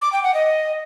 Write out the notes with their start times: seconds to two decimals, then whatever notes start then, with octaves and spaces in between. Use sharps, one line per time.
0.02 D6
0.12 G5
0.23 F#5
0.34 D#5